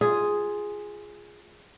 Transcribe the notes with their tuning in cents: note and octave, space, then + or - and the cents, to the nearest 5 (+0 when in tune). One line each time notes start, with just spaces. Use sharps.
F4 +0 G#4 +0